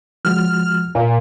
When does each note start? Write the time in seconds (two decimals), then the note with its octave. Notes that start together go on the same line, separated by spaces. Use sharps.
0.25 F3 G#3 F#4 F6
0.95 A#2